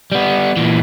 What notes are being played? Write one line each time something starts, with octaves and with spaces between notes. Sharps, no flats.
G3 B3
A#2 E3